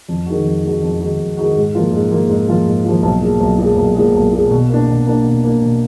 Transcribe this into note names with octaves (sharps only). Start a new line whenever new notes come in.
F2
D#3 G#3 D#4 F#4
F2
D#3 G#3 D#4 F#4
F2
D#3 G#3 D#4 F#4
F2
D#3 G#3 D#4 F#4
G#2
F3 A#3 F4
G#2
F3 A#3 F4
G#2
F3 A#3 F4
G#2
F3 A#3 F4
B1
A#2 G#3
B1
A#2 G#3
B1
A#2 G#3
B1
A#2 G#3
B2
A#3 D4
B2
A#3 D4
B2
A#3 D4
B2